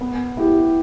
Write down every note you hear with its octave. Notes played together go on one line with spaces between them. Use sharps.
B3
E4 G4